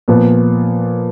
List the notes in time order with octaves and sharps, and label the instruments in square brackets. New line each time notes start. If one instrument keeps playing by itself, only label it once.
[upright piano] A#2 F3 B3